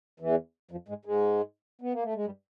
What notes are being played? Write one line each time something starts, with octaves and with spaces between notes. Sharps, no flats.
E2 E3
F2 F3
G#2 G#3
G#2 G#3
B3
A#3
A3
G#3
G2 G3